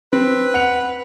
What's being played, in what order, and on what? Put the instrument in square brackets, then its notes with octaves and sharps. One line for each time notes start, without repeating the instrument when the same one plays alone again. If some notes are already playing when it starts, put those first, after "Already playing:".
[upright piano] C4 [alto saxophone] B4
[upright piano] F#5 C#7 F7